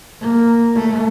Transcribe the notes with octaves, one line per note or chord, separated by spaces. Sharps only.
A#3
A3